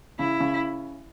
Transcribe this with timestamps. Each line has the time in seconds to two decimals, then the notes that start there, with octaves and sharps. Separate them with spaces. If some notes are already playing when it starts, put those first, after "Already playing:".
0.19 C#3 E4
0.40 C#3